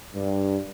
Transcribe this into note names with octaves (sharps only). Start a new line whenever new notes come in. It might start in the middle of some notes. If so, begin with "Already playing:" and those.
G2